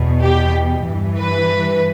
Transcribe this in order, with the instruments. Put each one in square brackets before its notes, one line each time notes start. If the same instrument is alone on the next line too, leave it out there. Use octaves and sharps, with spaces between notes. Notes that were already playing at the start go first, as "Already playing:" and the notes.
Already playing: [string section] E2 B2
G4
G2 E3
B4